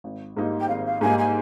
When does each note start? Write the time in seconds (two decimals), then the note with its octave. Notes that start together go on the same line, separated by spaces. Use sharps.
0.04 G#1
0.36 G#2 G3 A#3 D#4
0.60 G5
0.68 G#1 F5
0.85 F5
1.01 G#2 G3 A#3 D#4 G#5
1.18 G#5